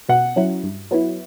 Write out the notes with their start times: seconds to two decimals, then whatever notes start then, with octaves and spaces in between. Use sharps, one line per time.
0.09 B2 F#5
0.36 F#3 C#4 E4
0.63 G2
0.91 F#3 B3 E4